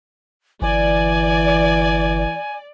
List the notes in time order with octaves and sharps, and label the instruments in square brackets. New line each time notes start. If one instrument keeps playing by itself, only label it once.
[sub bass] G1 [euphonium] E3 [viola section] D5 [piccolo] G#5